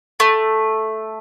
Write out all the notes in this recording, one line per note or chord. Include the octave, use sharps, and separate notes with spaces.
A3